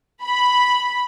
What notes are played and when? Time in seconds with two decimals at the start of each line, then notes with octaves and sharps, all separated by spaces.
0.24 B5